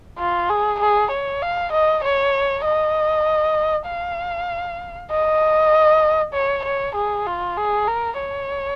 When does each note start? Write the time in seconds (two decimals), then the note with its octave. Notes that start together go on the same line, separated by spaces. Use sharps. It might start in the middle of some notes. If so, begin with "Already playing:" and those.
0.18 F4
0.50 G#4
0.80 G#4
1.11 C#5
1.42 F5
1.72 D#5
2.04 C#5
2.65 D#5
3.87 F5
5.11 D#5
6.34 C#5
6.65 C#5
6.95 G#4
7.26 F4
7.57 G#4
7.87 A#4
8.19 C#5